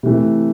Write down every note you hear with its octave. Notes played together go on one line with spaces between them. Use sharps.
C3 E3 A3